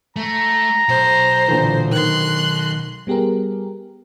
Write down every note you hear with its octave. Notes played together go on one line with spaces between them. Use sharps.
A3 A#5
B1 C5
A#2 D3 E3
D#3 C6 F#6
G3 B3 G4 G#4 A#4